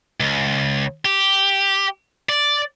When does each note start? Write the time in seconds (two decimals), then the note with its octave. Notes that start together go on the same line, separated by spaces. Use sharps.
0.20 C#2
1.05 G4
2.29 D5